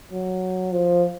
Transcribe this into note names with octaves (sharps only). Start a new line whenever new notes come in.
F#3
F3